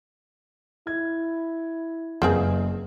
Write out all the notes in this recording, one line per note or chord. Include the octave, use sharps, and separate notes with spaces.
E4 G#6
F#1 A#3 C4 G#4 B4